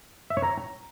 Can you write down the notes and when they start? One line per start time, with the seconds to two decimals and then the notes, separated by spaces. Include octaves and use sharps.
0.30 E5
0.37 C#5
0.43 A#5